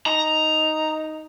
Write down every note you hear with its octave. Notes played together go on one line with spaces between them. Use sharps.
D#4 A#5